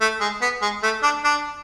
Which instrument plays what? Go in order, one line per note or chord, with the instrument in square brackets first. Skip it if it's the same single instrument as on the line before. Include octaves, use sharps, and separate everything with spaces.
[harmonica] A3
G#3
B3
G#3
A3
D4
D4